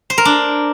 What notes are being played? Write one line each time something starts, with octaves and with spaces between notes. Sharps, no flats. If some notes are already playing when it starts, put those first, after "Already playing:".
C5
A#4
D4